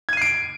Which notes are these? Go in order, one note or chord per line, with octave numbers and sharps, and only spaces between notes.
G#6 C7 D7 D#7